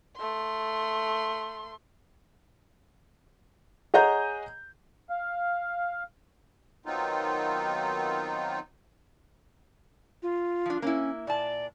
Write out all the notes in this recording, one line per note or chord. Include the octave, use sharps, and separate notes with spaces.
A3 C6
G#4 C#5 D#5 F#5 A#5 G6
F5
D#3 F#3 B3 C4 D#4 F4
F4
F3 D4
A#3 C#4 E4
A#2 D5 A5